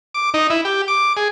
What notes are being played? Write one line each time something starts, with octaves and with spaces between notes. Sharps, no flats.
D6
D#4
E4
G4
D6
G#4